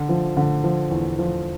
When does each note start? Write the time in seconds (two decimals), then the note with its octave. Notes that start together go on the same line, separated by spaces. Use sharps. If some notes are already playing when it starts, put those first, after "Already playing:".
Already playing: D3
0.09 F3
0.37 D3
0.64 F3
0.91 E2
1.19 F3